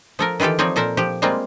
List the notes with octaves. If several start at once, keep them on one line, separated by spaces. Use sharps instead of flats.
F3 A4 A#4
D#3 E3 F4 G4 A4
F3 C4 D#4 C#5 D5
A#2 A4 A#4 C5
F3 G4
G3 G#3 A#3 C4 F4